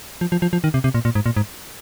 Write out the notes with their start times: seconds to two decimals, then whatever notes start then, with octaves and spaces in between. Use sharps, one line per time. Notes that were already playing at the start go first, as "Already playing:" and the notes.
0.21 F3
0.32 F3
0.42 F3
0.53 F3
0.64 D#3
0.74 C3
0.84 C3
0.94 A#2
1.05 A#2
1.15 G#2
1.26 A#2
1.37 G#2